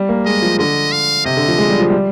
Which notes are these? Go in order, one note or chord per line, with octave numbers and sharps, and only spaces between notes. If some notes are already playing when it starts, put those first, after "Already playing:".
Already playing: G3
A#3
G#3 D#5
F3
D3 D#5
F5
C3 D#5
D3
F3
G#3
G3
F3
G3